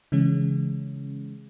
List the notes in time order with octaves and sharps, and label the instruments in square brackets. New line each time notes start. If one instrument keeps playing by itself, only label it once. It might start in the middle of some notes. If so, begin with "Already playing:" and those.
[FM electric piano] C#3 E3 G#3 C#4